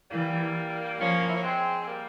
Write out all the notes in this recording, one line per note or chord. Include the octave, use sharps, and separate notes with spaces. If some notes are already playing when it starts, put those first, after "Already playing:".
E3 G3 A#3
F3 A#3 C#4
E4
C#4
G#3 C4
C4
G3 A#3